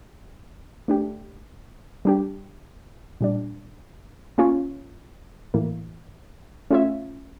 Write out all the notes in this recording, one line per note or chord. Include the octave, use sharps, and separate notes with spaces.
A3 D4 G4
G3 D4 G4
A#2 G3 D4
A#3 C#4 F4 C#5
A2 E3 A#3
A3 C#4 F4 C#5 E5